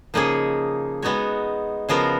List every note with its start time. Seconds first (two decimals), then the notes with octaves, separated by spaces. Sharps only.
0.14 C#3 F3 A#3 D#4 G#4
1.02 G#3 B3 D#4 F#4 C#5
1.89 C#3 F3 B3 F#4 A#4